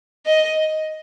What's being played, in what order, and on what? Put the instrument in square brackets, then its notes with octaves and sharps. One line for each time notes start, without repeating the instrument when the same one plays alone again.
[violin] D#5